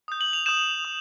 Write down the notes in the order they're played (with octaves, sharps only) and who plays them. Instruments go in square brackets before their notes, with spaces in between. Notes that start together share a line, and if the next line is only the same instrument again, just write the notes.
[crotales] D#6 G6
F#7
F7
D#6 G6 E7
D#6